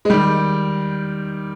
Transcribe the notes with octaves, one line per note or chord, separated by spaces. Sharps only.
G#3
D#3 G3